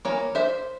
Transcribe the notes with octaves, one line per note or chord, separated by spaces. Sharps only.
E3 A#3 C#5
C5 E5